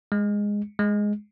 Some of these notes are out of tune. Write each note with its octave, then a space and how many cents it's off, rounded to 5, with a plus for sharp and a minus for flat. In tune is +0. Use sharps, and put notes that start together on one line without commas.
G#3 -10
G#3 +0